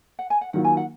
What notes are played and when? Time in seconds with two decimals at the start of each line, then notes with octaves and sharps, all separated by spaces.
0.19 F#5
0.30 G#5
0.41 F#5
0.53 D#3 F#3 A#3 F4 F#5
0.65 G#5
0.77 F#5